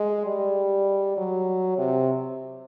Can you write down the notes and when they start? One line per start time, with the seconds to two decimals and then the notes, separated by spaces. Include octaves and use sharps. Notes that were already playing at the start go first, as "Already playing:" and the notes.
Already playing: G#3
0.26 G3
1.17 F#3
1.78 C3